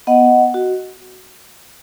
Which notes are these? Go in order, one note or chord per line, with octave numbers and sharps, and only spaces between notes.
B3 D#5 F#5
F#4